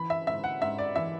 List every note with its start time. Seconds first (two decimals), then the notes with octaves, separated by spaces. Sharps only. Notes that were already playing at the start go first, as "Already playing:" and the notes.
Already playing: E3 B5
0.10 E5
0.27 G#2 E5
0.44 F#5
0.61 G#2 E5
0.78 D5
0.96 E3 E5